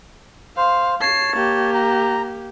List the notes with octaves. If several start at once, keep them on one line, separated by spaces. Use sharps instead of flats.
C5 F5
C#5 A5 C7
A#3 G4
A#5